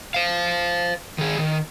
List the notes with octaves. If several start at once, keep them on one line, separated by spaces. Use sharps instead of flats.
C5 F5
D#3 G#4
D#3